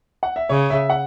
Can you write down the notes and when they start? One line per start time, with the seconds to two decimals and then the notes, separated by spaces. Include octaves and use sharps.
0.23 F#5
0.36 E5
0.49 C#3 C#5
0.70 E5
0.90 F#5